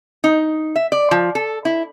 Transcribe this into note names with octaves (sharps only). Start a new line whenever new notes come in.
D#4
E5
D5
F3
A4
E4